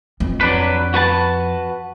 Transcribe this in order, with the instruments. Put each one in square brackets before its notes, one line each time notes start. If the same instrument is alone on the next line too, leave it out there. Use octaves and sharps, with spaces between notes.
[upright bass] F2
[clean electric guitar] F#3 D4 B4
F#4 B4 A5